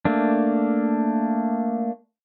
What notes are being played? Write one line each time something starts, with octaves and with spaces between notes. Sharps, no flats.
A3 A#3 D4